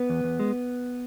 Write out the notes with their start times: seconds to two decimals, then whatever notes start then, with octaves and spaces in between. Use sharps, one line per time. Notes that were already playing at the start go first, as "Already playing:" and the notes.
Already playing: B3 B4
0.09 E2
0.24 E2
0.40 G#3